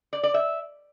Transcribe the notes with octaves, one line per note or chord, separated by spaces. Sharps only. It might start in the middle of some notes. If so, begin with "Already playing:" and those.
D5
D5
E5